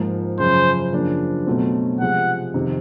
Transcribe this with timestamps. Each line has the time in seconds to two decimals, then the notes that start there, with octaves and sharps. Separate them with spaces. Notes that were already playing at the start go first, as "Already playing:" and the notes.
Already playing: G#2 F3 A#3
0.39 F#2 C#3 F3 C5
0.92 F#2 C#3 F3 A#3 D4
1.46 B2 F#3 A3 C4
2.00 C3 F3 G#3 F#5
2.54 F2 C3 D#3